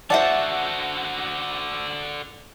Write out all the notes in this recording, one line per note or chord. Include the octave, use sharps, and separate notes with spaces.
D3 F#4 C5 D5 E5 F#5 A5